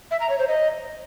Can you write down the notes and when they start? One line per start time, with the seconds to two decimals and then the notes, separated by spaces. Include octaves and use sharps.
0.11 E5
0.20 A#5
0.30 C#5
0.39 C5
0.48 D#5